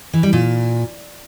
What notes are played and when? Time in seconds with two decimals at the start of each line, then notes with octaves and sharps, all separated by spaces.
0.13 E3
0.23 G3
0.33 A#2